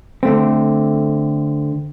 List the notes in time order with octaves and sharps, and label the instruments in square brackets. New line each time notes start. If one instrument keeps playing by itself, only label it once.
[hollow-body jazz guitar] D3 A3 C4